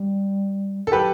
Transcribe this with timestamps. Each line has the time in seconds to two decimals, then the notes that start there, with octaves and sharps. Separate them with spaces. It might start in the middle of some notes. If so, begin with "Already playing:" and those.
Already playing: G3
0.87 A4
0.92 F#3 G4 B4